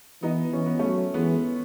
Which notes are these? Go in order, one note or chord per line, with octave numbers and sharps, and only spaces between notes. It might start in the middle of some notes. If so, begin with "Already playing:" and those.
E3 B3 D#4
E3 C#4
B3
F#3 A3 C#4
E3 G#3 B3